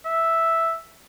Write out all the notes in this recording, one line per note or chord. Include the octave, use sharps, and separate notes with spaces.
E5